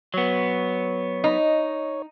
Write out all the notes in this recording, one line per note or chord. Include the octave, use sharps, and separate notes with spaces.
F#3 B3 C#5
D#4